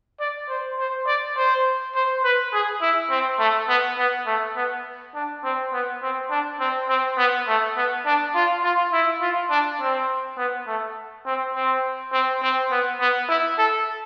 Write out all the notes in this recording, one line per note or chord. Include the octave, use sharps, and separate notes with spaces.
D5
C5
C5
D5
C5
C5
B4
G#4
E4
C4
A3
B3
B3
A3
B3
D4
C4
B3
C4
D4
C4
C4
B3
A3
B3
D4
F4
F4
E4
F4
D4
C4
B3
A3
C4
C4
C4
C4
B3
B3
E4
A4